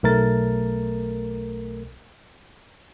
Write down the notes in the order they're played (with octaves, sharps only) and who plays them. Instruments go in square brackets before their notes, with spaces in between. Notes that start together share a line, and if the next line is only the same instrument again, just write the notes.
[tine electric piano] B1 A3 A#4 A6